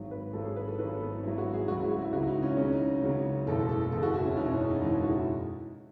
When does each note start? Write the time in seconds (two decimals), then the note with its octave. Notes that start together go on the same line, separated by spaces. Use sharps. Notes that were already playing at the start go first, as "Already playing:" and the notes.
Already playing: G#1 G#2 F#3
0.11 B4
0.33 G#1 G#2 F#3 A4
0.45 G#4
0.56 B4
0.67 A4
0.79 G#1 G#2 F#3 B4
0.90 A4
1.00 B3
1.12 D#4
1.23 G#1 G#2 F#3 E4
1.38 F#4
1.53 G#4
1.68 C#2 C#3 F#3 F#4
1.80 E4
1.91 F#4
2.02 E4
2.12 C#2 C#3 F#3 F#4
2.28 D#4
2.43 C#4
2.57 C#2 C#3 F#3 C#4
2.72 D#4
3.02 C#2 C#3 F#3
3.47 F#1 E2 B2 G#3 A4
3.59 A4
3.69 A4
3.81 A4
3.92 F#1 E2 B2 G#3 A4
4.03 F#4
4.14 E4
4.25 C#4
4.36 F#1 E2 B2 G#3 D#4
4.48 C#4
4.60 D#4
4.70 D#4
4.81 F#1 E2 B2 G#3 D#4
4.92 E4
5.04 F#4
5.15 E4